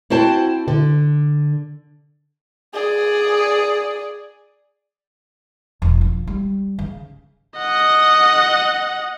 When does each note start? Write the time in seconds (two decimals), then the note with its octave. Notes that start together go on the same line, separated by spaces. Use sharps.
0.10 C4 E4 F#4 C5 G5 A5
0.68 D3
2.74 G#4 D5
5.82 E1
6.01 F3
6.27 G3
6.79 C#3
7.58 D#5 F#5